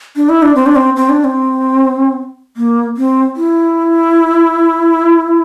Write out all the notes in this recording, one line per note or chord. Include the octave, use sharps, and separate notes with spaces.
D4
E4
D4
C4
D4
C4
C4
D4
C4
A#3
C4
E4